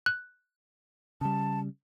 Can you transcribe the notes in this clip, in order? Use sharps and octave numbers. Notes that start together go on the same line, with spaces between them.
F#6
C#3 G3 A5